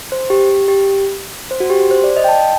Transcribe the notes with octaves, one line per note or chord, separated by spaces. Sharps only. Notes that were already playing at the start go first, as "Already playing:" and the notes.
C5
G4
G4
C5
F#4
G4
C5
D5
D#5
G5
A5